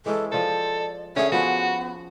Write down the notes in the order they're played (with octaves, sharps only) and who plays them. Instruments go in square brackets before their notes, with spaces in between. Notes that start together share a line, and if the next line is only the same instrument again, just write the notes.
[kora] E3 G#3 C#4 [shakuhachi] A4
[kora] F3 C5 [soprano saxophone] A4 [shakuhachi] D5
[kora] D3 G#4 [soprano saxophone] C#4 [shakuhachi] E5
[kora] F3 C#4 [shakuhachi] B3 [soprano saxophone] F#4